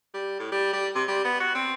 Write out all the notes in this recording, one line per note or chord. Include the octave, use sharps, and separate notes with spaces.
G3
A2
G3
G3
C3
G3
B3
F#4
C4